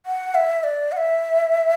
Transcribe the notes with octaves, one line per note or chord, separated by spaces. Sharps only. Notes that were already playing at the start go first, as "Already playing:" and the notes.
F#5
E5
D5
F#5
E5